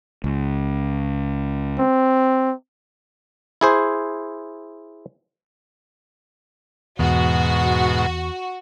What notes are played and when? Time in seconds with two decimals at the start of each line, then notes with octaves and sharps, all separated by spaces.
0.24 C#2
1.79 C4
3.61 E4 G#4 C5
6.99 E2 G#2 B2 F#4